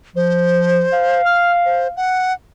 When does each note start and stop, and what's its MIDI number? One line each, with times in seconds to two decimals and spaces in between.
0.16 0.87 53
0.16 1.22 72
0.93 1.98 77
1.25 1.52 89
1.65 1.88 72
1.97 2.33 78